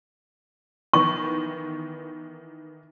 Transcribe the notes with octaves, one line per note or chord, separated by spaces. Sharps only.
D#3 E3 B3 C#6